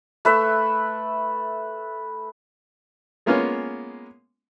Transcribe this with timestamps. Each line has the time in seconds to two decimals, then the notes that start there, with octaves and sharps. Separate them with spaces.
0.25 A3 B4 E5
3.26 G#3 A#3 B3 C#4 F4